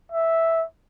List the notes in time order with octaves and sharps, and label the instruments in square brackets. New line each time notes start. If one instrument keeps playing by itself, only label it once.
[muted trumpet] E5